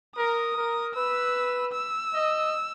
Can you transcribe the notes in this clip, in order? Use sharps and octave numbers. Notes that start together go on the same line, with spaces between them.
A#4 D#6
A#4
B4 E6
E6
D#5